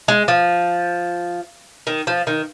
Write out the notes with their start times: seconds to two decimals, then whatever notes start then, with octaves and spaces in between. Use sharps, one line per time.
0.08 G#3
0.28 F3
1.87 D#3
2.07 F3
2.27 D#3